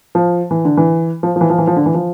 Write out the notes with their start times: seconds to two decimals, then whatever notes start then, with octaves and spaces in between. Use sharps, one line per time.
0.15 F3
0.51 E3
0.65 D3
0.77 E3
1.23 F3
1.36 F3
1.41 E3
1.50 F3
1.58 E3
1.67 F3
1.76 D3
1.86 E3
1.94 F3